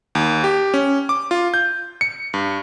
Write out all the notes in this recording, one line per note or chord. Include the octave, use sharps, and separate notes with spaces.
D#2
G4
C#4
D6
F4
G6
C#7
G2